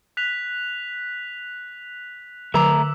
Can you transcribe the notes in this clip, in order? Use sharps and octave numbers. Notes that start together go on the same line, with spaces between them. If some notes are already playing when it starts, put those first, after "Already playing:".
F#6 B6 F7
D3 A3 A#5 D6 E6